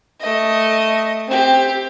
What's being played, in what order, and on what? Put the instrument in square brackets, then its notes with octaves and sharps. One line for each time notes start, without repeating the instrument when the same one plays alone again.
[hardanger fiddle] A3 D#5
C4 G4